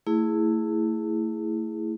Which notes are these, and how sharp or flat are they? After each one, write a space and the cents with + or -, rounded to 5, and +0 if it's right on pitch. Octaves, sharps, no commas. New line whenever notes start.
A3 +30 E4 +0 G#4 +0